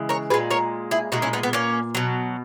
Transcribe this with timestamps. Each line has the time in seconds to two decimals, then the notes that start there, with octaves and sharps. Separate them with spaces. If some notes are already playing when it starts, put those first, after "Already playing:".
Already playing: C#3 E3 G#3
0.09 A#4 C#5
0.30 A#2 G#3 G#4 B4
0.51 A#4 C#5
0.91 E4 G#4
1.12 A#2 G#3 D#4 F#4
1.22 C#4 E4
1.33 B3 D#4
1.43 B3
1.53 A#3 C#4
1.95 B2 F#3